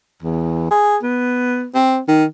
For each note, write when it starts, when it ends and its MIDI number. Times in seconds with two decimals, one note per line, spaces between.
0.22 0.68 40
0.71 0.97 68
1.03 1.67 59
1.74 1.99 60
2.08 2.25 51